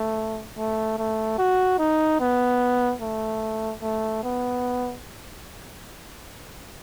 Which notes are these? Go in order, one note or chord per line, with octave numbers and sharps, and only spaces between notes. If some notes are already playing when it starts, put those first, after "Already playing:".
Already playing: A3
A3
A3
F#4
D#4
B3
A3
A3
B3